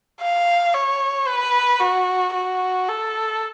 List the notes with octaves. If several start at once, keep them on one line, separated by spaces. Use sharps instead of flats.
F5
C#5
B4
F#4
F#4
A4